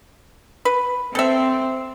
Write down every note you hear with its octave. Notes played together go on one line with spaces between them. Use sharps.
B4
C4 A4 E5